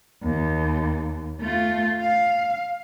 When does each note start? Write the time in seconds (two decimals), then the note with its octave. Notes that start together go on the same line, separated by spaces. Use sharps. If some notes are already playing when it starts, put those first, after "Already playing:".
0.23 D#2
1.41 A3 F4
2.01 F5